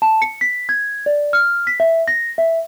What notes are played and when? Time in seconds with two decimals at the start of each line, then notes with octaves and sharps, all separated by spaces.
0.02 A5
0.22 C#7
0.41 B6
0.69 G#6
1.06 D5
1.33 F6
1.67 B6
1.80 E5
2.08 A#6
2.38 E5